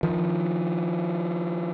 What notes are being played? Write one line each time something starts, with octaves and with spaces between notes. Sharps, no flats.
D#3 F3